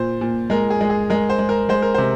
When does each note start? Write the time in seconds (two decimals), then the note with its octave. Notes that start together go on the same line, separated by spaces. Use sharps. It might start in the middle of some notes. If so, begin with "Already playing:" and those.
Already playing: A#2 C5
0.21 A#2
0.50 G#3 A#4
0.70 G#4
0.81 G#3
0.90 G#4
1.10 G#3 A#4
1.30 C5
1.39 G#3
1.49 A#4
1.69 G#3 C5
1.82 A#4
1.94 C3 C5